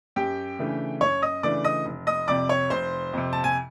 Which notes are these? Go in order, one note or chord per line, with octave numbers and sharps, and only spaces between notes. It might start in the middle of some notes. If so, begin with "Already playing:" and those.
F#2 G4 G5
C#3 E3 A3 D4
F#2 C#5 C#6
D#5 D#6
C#3 E3 A3 D4 D5 D6
D#5 D#6
F1
D#5 D#6
F2 C3 D5 D6
C#5 C#6
F1 C5 C6
F2 C3
A5
G#5